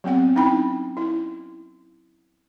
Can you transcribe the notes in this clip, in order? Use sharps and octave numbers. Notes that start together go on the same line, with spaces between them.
F#3 B3 C4 F#5
C#4 D#4 E4 G5 B5
E4